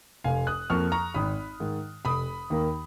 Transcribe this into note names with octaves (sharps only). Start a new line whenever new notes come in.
F1 F5 G#5
D#6 F#6
F2 F3 A#3 C#6 F6
A#5 C#6
G#1 B5 D#6
G#2 D#3
F1 B5 D#6
D#2 D#3 A#3